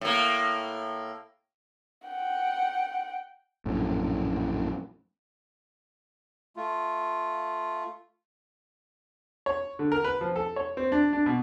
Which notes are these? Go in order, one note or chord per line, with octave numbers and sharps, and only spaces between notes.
A2 A#3
F#5 G5
A#1 F#2 A2
A3 F4
C#5
D3
A#4
B4
F3
A4
C#5
C4
D4
D4
B2